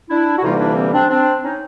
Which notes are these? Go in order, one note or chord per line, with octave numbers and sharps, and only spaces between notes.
D4 E4
F#4
D2 C3 E3 G3 A#3 D#4 F4
D4 E4
C4
C4 D4
C4 D4
C#4 D#4